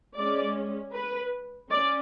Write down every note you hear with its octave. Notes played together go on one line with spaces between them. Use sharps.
G#3 C#4 D5
B4
C#4 D5